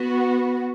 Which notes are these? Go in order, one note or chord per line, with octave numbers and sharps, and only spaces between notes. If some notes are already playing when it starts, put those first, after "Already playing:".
Already playing: B3 F#4